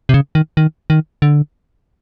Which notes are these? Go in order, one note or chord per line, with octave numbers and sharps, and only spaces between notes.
C3
C#3
D#3
D#3
D#3
D3